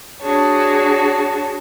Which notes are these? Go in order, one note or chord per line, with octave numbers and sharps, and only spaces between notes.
D4 F#4 G#4 C#5 A5